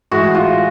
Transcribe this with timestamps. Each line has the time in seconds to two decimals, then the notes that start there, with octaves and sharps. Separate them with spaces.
0.11 A2 E3 G#3 F#4
0.35 F4